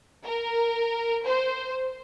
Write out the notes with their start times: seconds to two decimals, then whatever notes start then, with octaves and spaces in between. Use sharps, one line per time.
0.24 A#4
1.25 C5